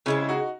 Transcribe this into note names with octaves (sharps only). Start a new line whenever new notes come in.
C#3 G#3 C4 C#4 E4
E4
D#4 F#4